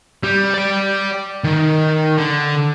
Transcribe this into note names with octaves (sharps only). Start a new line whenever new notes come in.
G3
D5 G5
D#3
D3